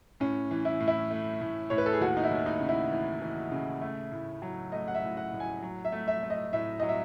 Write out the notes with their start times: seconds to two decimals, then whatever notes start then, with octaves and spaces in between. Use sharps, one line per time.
0.20 A2 C#4
0.51 E3
0.65 E4
0.80 A2
0.88 E4
1.10 A3
1.41 A2
1.70 A2 C#5
1.78 B4
1.86 A4
1.93 G#4
2.01 D#2 F#4
2.17 D#4
2.24 E4
2.31 D#2
2.46 D#4
2.61 C#3
2.69 E4
2.91 E3
3.21 E3
3.52 C#3
3.81 A3
4.12 A2
4.42 F#3
4.72 A3 D#5
4.88 F#5
4.95 E5
5.02 A2
5.17 F#5
5.32 A2
5.40 G#5
5.62 F#3
5.85 E5
5.92 A3
6.08 E5
6.23 A3
6.30 D#5
6.53 A2 E5
6.80 F#3 D#5
6.89 E5